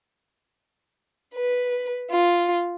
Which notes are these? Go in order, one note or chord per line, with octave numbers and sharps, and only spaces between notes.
B4
F4